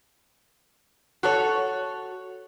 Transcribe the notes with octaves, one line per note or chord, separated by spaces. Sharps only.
F#4 A4 C#5